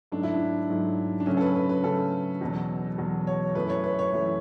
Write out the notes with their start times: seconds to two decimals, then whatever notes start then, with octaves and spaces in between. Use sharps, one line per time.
0.12 G#2 F#3 A3 D4
0.23 E4
0.34 D4
0.69 G#2 F#3 A3
1.20 D4
1.26 C#3 F#3 A3 C#4
1.37 A4
1.41 B4
1.55 B4
1.69 B4
1.84 C#3 F#3 A3 A4
2.41 E2 B2 F#3
2.98 E2 B2 F#3
3.27 C#5
3.55 F#2 E3 A3 B4
3.70 C#5
3.84 B4
3.99 C#5
4.13 F#2 E3 A3